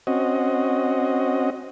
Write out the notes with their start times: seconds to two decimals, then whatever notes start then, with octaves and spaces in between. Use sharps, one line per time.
0.07 C4 C#4 F#4 D#5